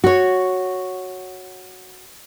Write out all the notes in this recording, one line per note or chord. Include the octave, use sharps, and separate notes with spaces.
F#4 C#5